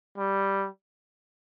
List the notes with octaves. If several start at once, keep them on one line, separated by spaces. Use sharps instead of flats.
G3